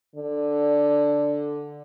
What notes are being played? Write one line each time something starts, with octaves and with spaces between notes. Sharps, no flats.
D3